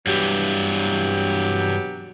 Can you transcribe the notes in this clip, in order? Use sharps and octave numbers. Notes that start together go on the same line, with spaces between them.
G2 B2 E3 F#3 G4